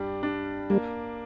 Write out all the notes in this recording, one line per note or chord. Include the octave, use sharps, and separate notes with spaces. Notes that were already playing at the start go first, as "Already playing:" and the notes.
Already playing: G2 G3 D4
D4
G3 A#3